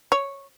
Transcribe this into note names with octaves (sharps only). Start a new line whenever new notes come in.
C#5